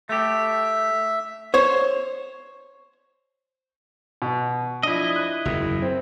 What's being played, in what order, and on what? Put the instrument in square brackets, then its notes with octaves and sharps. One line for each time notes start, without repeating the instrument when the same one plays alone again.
[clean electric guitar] A3 G4 [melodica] E5
[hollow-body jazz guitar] C5 C#5
[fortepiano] B2
[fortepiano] F3 D4 [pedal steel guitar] E4 D#5
[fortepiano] F#6
[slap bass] F#1 E2
[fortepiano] C4